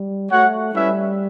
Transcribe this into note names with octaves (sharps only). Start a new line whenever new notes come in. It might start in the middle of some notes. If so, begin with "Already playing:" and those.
Already playing: G3
A3 F#4 C#5 F#5
G3 C#4 E4 B4 E5